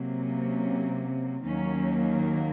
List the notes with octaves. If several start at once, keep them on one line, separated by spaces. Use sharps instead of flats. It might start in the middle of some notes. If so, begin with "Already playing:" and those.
Already playing: C3 F#3 A#3
C#4
D#2 D#3 F#3 A#3 C#4